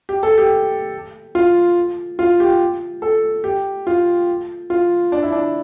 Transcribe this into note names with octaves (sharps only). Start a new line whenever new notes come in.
G4
A4
G4
F4
F4
G4
A4
G4
F4
F4
D4
E4
D4